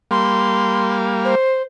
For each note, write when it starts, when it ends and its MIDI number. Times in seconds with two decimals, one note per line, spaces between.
0.11 1.35 55
0.11 1.35 58
0.11 1.35 77
0.11 0.95 84
1.24 1.62 72